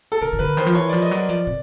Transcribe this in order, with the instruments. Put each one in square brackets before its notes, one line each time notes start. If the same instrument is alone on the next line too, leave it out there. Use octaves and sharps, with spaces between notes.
[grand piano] A4
[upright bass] C#3 [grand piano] A#4
[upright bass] C#3
[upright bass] D3 [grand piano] B4
[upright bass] D#3 [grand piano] C5
[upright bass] F3
[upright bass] E3 [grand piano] C#5
[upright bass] F3 [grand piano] D5
[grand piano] D#5
[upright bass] F#3 [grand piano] D5
[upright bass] F3 [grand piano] D5
[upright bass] C3